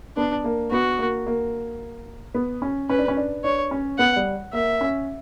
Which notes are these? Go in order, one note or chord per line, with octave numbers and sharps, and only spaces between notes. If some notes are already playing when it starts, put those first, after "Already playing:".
B3 D4
A#3
B3 F#4
A#3
A#3
B3
C#4
C#4 B4
D4
C#4
D4
D4 C#5
C#4
B3 F#5
G3
A#3 E5
C#4